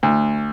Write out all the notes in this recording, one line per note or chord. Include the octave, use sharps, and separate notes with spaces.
D2